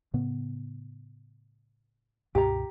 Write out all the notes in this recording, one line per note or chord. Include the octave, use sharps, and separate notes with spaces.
A2 C#3 B3
C#2 G2 B2 G4 A#5